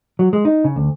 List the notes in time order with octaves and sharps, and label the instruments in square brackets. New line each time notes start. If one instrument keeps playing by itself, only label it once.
[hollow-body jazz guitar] F#3
G#3
D#4
C#3
D2